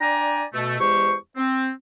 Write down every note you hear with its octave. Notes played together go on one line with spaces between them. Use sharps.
D4 D5 G5 G#5 A#5
B2 A3
E2 G#3 G4 C5 C#6
C4